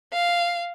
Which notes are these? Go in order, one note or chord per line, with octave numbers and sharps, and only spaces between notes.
F5